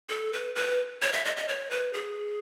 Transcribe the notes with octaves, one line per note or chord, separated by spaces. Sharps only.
A4
B4
B4
C#5
E5
D#5
D#5
C#5
B4
G#4